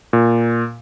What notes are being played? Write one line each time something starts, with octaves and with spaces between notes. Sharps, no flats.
A#2